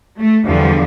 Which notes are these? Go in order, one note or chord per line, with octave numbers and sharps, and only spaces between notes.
A3
E2 D3 F3 G3